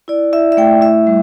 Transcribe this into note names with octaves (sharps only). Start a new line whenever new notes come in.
E4 D5
E4 E5
E5
A3 G5
E4 E5
G3